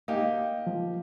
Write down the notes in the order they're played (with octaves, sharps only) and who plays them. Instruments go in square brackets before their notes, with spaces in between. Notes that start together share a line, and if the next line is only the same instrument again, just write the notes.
[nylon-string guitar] A#3 [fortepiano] D#4 G4
[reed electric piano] F3